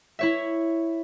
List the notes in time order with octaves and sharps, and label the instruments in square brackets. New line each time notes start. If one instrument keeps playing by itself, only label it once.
[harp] E4 C#5 E5